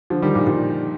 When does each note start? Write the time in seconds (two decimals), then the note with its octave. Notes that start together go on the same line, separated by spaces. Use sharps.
0.10 D3 F3
0.22 D#3 G3
0.35 A#2
0.47 A#2